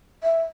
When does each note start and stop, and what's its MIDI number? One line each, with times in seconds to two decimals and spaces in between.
0.23 0.42 76